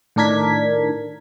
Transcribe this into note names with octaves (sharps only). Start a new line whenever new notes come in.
A2 D#3 D4 A#4 G#6 B6